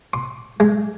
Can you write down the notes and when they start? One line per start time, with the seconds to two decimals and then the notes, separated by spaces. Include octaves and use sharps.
0.13 C6
0.60 G#3